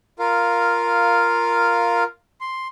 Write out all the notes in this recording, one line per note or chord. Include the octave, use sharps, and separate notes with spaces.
F4 A#4 F5
C6